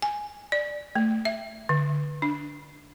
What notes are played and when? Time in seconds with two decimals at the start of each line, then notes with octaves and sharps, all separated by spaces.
0.02 G#5
0.52 D5
0.96 A3
1.25 E5
1.69 D3
2.22 D4